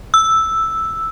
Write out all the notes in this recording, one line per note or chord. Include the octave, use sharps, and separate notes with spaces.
E6